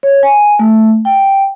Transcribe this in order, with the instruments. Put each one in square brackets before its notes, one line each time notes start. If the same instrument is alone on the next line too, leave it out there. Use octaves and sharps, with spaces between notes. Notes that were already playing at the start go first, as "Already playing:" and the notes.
[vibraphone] C#5
G#5
A3
G5